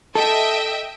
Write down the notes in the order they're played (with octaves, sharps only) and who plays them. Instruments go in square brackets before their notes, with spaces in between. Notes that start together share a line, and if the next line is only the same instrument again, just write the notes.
[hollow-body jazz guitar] A4 [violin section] D#5 E5 G5